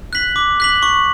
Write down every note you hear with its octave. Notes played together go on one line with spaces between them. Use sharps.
F#6 B6 F#7
D6
F#6 B6 F#7
C#6